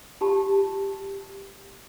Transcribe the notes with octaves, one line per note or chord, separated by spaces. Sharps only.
F4 G4 A5